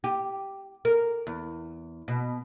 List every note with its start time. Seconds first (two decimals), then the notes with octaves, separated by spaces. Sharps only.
0.04 G4
0.85 A#4
1.27 E2
2.08 B2